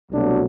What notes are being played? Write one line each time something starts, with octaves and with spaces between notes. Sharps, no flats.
C2 B2 F#3 A3 D4